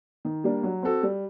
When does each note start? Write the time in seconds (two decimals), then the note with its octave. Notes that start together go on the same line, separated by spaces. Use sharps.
0.25 D#3
0.44 G3 A#3 D4
0.63 F#3
0.83 C4 F#4 A4
1.03 G3